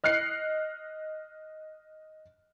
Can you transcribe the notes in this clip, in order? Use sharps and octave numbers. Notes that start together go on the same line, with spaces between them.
D#5 F6 F#6 C7 C#7